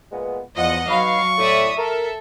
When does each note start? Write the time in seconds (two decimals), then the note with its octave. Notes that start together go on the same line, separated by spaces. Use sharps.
0.12 A#2 G#3 B3
0.57 E2 F3 D#5 F#5
0.88 F#3 D#4 B4 F5 B5 C#6
1.38 A2 D5 E5 D#6
1.78 A4 A#4 E5